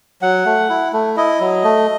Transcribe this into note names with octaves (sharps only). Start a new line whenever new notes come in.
F#3 F#5
A3
E4
A3
E4 D#5
F#3
A3